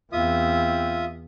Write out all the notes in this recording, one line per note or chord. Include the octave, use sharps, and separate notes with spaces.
E2 C4 F4 E5 D#6